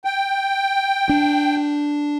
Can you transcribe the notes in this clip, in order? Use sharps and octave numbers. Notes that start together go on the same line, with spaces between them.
G5
D4